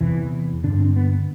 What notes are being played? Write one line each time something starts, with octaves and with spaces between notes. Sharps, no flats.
E2 C3 E3
G2 D3 D4
C4
B3